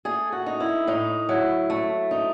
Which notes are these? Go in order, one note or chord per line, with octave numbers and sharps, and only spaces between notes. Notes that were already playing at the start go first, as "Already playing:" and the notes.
A3 G#4
F#4
D#4
E4
A2 D#4
F#3 E4
A3
D#4